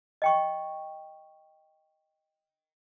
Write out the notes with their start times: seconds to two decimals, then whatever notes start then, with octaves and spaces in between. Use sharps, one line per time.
0.22 D#5 G5 C#6